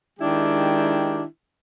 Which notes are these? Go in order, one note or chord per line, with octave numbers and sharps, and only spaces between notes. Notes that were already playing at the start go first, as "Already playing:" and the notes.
D#3 G#3 D4 E4 G4